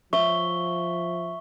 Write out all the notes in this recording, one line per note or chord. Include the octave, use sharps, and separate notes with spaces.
F3 E5 C#6 G7